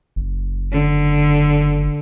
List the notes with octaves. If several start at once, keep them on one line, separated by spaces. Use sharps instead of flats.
F#1
D3